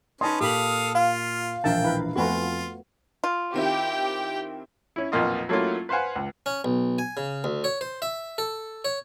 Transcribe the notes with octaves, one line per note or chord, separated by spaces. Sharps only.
C#4 D#4 B4 D#5 A5 C6
A#2 G4 A4 F5 B5 D#6
F4 F5
E1 A#1 A#4 E5 G5 A5
E4 A#4 B4
F2 A3 B3 F4 F#4 G#5 B5
F4
D#3 C4 E4 G4 G5
C#4 E4
B1 F2 A#2 A#3 F4 D#5
F#3 A3 A#3 C#4 E4 F4
B4 C5 F5 F#5 G#5
C#2
C#4
B1
G#5
C#3
D2
C#5
C5
E5
A4
C#5